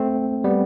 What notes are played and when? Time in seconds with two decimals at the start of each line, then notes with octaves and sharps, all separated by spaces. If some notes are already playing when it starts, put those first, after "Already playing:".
Already playing: A3 C4
0.44 G3 B3